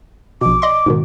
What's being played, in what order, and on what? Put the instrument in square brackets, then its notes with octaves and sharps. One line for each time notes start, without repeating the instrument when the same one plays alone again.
[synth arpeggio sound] A#1 B2 [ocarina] D6
[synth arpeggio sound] D5 D#5 C6
G#2 B2 D#3